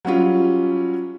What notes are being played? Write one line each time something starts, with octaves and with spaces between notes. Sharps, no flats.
F#3 G3 C#4 F4